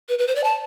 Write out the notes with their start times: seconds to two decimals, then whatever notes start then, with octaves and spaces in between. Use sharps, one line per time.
0.09 B4
0.19 B4
0.27 C5
0.35 D5
0.44 A5